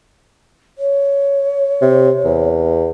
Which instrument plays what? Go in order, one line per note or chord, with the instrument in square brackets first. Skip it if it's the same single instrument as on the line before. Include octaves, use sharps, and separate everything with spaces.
[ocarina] C#5
[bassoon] C3
E2